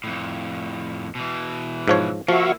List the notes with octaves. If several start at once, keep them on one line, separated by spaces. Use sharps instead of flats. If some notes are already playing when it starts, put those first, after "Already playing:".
F2 A2
B2 E3
G#2 F3 C#5
F3 A#3 E4 F#4 E5 C#6